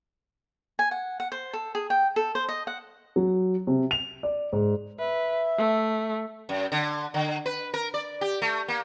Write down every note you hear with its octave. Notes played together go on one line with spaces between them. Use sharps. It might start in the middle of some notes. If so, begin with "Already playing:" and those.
G#5
F#5
F#5
C5
A4
G#4
G5
A4
C5
D#5
F#5
F#3
C3
F7
D5
G#2
B4 E5
A3
F#2
D3
D3
B4
A#4
D5
G4
A3
A#3